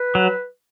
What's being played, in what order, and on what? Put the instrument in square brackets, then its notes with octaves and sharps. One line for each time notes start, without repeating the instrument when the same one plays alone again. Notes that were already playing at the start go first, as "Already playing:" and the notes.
Already playing: [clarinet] B4
[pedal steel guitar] F#3